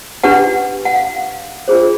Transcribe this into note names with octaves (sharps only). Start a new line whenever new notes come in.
D4 G4 B4 F#5
F#5
F5
D4 F4 G#4 C5